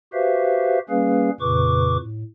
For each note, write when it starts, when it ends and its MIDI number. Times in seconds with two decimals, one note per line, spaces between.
0.13 0.78 66
0.13 0.78 67
0.13 0.78 71
0.13 0.78 72
0.13 0.78 76
0.13 0.78 77
0.89 1.30 55
0.89 1.30 58
0.89 1.30 61
0.89 1.30 68
0.89 1.30 71
0.89 1.30 77
1.41 1.97 41
1.41 1.97 46
1.41 1.97 49
1.41 1.97 71
1.41 1.97 85
1.41 1.97 86
1.97 2.23 45